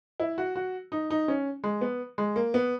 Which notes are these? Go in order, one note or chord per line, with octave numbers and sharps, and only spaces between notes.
E4
F#4
F#4
D#4
D#4
C#4
G#3
B3
G#3
A#3
B3